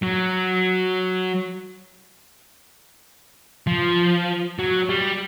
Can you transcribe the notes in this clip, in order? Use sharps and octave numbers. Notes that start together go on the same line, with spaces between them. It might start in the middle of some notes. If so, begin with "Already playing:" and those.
F#3
F3
F#3
G3